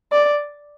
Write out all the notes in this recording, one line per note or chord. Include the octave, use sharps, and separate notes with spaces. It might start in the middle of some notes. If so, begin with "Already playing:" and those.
D5